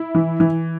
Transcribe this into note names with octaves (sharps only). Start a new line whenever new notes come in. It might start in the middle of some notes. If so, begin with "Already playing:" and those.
Already playing: E4
E3
E3